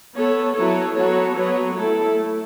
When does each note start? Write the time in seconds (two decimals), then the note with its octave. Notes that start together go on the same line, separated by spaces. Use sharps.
0.16 B3 A4 C#5
0.55 F#3 B3 E4 A4 C#5
0.96 F#3 B3 F#4 A4 C#5
1.35 F#3 B3 F#4 C#5
1.74 A3 E4 A4
2.14 A3